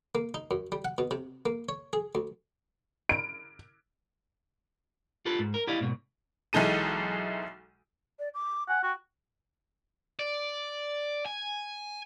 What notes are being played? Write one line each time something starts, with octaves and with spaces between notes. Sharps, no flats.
A#3
D#4
F#2
G3
F#5
B2
C3
A#3
C#5
G#4
D2
D7
F4 G4 A4 B4
G#2
A#4
E4 G4 D5 D#5 F5
G#2 B2
B1 E3 G#3 D#4 A4 D#7
D5
D6
F#5 G#5
F#4 G5
D5
G#5